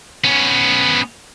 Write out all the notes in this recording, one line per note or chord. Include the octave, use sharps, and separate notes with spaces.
B3 C#4